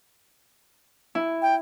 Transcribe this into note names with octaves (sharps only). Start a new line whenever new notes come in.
E4
G5